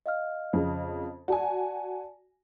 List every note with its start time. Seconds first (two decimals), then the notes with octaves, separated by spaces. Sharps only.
0.06 D#5 F5 F6
0.53 F2 C#3
1.28 F#4 D5 G#5 A5